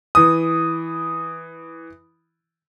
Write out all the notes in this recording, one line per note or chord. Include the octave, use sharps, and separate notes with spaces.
E3 D#6